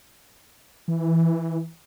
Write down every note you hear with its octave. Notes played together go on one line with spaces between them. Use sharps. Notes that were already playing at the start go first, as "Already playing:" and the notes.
E3